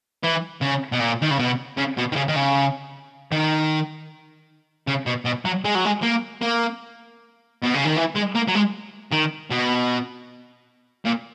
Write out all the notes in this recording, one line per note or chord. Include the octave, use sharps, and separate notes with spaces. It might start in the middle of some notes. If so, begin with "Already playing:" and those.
E3
C#3
B2
A#2
D#3
C#3
B2
C#3
B2
D#3
C#3
D#3
C#3
D#3
C#3
B2
B2
F#3
G#3
F#3
G#3
A#3
A#3
B2
C#3
D#3
E3
G#3
A#3
F#3
G#3
D#3
B2
A#2